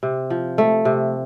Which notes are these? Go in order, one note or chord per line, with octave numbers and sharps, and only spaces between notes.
C3
F3
A3
C3